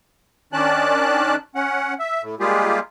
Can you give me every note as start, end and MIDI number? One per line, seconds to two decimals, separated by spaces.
0.53 1.36 51
0.53 1.36 61
0.53 1.36 62
0.53 1.36 74
0.53 1.36 81
0.53 1.36 90
1.55 1.94 61
1.55 1.94 78
1.99 2.22 76
2.22 2.35 45
2.40 2.79 55
2.40 2.79 56
2.40 2.79 58
2.40 2.79 65
2.40 2.79 67
2.40 2.79 68